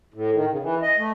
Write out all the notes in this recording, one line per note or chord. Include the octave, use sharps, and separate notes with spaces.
A2
D#3
C#3
E3
D#5
A3